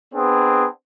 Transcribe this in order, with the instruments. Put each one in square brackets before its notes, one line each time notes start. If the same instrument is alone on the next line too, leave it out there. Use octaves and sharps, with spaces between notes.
[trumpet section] B3 C4 D4 G#4